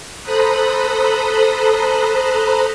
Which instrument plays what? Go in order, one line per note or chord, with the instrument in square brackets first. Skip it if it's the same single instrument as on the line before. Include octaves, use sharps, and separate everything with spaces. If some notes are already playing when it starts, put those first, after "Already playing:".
[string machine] A4 C5 A#5 B5 D#6 F#6